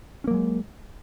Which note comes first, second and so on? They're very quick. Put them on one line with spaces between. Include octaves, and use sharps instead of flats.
C#4 A#3 F#3 G#3